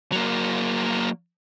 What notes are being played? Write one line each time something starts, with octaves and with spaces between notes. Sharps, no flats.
F#3 A#3